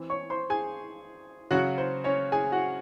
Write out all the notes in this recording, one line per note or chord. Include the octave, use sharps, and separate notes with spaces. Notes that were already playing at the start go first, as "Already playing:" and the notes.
Already playing: E3 C4
C#5 C#6
C5 C6
G#4 G#5
C#3 F#3 C#4 F#4 F#5
C5
C#4 C#5
G#4 G#5
F#4 F#5